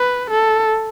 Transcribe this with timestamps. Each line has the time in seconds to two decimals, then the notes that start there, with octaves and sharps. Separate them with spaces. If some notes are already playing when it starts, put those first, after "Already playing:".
Already playing: B4
0.30 A4